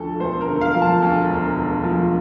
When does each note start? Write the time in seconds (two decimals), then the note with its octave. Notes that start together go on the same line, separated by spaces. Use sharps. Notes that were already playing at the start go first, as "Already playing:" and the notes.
Already playing: D2 F3 A4
0.20 E1 C5
0.41 A#4
0.48 D3
0.61 F5
0.75 F3
0.82 A5
1.02 D2
1.29 E1
1.57 D3
1.84 F3